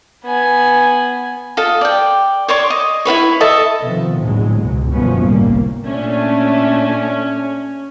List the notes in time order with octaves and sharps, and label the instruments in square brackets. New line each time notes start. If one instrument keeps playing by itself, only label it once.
[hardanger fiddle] B3 G#5
[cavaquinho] F4 A4 D#5
D5 G5
C#5 D5 C6 C#6
D#5
E4 F#4 B4 C#5
A4 D#5 E5 A5
[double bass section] C3 D#3 F3 B3
A#1 E2 A2 D3 F#3 G#3
C#2 G#2 B2
G1 F#2 B2 F3 B3 C#4
G1 C2 A2 G3 A#3
[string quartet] A#2 A3 D4 [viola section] C#4